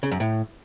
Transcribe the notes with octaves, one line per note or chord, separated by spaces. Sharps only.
C#3
F#2
A2